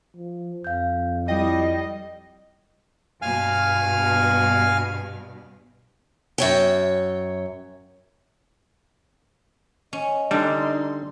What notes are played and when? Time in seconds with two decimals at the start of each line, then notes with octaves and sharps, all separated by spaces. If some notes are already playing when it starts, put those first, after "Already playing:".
0.16 F3
0.64 F2 F5 G6
1.28 G3 E4 D#5 G5
3.22 G2 B2 F5 G#5 F6
6.38 F#2 C#5 G5
9.93 C#4 D#5
10.31 D3 G3 D4 D#4 C6